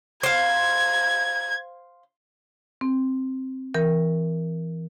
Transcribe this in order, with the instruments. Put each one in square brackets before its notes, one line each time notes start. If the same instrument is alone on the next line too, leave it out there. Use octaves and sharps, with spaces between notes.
[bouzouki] C5 F5 [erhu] G#6
[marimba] C4
E3 A#4